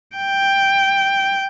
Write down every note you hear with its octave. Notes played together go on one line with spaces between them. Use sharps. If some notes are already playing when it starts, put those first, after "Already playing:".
G5